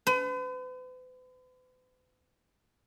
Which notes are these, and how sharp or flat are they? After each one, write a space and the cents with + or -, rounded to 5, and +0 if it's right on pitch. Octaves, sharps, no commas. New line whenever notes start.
B4 +45